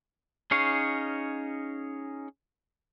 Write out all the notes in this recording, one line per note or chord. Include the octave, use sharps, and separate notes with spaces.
C#4 D#4 G#4 C#5 F5